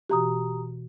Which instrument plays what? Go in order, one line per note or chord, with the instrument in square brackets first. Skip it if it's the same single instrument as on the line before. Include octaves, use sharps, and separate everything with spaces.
[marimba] B2 E3 F#4 [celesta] G4 A#5 D#6